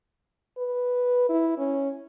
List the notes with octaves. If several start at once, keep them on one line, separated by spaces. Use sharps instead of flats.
B4
E4
C#4